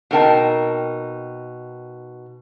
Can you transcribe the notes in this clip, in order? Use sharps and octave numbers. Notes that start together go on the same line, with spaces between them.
B2 C4 D#4 A#4 G5 A5